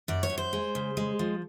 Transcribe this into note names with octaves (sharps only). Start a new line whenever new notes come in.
F#2 D5
C#5
F#2
C5
G#3
C#3
G#3
F3